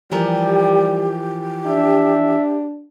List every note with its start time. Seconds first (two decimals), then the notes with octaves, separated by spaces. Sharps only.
0.11 E3 F3 G3 G4 A#4
1.66 D4 E5